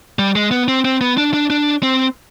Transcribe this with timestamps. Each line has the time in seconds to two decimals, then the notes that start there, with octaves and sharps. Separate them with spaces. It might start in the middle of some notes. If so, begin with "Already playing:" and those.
0.19 G3
0.36 G#3
0.51 B3
0.68 C4
0.85 C4
1.01 B3
1.17 D4
1.34 D4
1.50 D4
1.83 C4